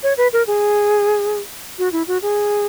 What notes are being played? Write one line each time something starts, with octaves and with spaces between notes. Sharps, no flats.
C#5
B4
A#4
G#4
F#4
E4
F#4
G#4